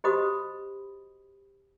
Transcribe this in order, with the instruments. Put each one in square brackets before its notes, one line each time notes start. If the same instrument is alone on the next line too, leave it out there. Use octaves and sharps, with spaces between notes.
[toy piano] F#4 G4 C5 D#5 B5 D#6